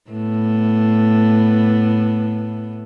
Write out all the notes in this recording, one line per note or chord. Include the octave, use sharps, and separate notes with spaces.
A2 A3 B3